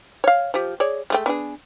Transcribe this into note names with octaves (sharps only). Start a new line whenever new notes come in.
C#5 F5
F3 G4
G#4 C#5 D5
G#3 A3 G5
B3 D4 G#4